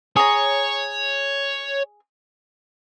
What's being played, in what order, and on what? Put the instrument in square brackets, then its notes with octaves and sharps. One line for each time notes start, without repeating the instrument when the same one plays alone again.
[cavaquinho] G#4 A#5 [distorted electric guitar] C#5